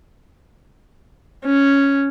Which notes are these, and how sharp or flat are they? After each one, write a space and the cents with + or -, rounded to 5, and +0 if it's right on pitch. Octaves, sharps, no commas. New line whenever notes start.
C#4 +0